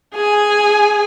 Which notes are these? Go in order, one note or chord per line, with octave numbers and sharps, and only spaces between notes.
G#4 G#5